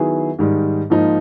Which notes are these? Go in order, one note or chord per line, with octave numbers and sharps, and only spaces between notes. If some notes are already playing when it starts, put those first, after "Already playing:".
Already playing: D#3 F#3 B3 E4 G#4
G#2 D#3 G3
G#2 F3 A#3 D#4